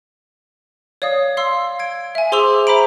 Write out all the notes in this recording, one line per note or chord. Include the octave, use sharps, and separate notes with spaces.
C#5 D5 F5 D#6
F5 C6 E6
G#6 D7
E5 G#5
G#4 C5 C6 D6 E6 F7
C5 E5 A#5 B5 D7